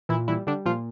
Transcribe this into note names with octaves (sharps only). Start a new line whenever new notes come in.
A#2 E3 E4
E3 G3 E4
D3 G3 D4
A#2 F3 F4